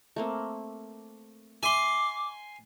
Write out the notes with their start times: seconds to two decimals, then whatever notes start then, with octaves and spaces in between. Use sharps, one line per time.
0.16 A3 A#3 C4
1.63 E5 G#5 C6 D6